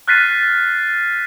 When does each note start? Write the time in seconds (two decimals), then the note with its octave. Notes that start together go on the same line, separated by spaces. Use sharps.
0.08 F6 F#6 A6 B6 C7 D#7